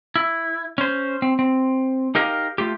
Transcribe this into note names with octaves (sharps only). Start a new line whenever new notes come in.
E4
C#4 C5
C4
C4
D#4 G4 A#4 D#5 F5
A3 F4 G4